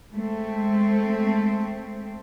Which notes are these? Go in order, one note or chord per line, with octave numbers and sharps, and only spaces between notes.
G#3 A3 C4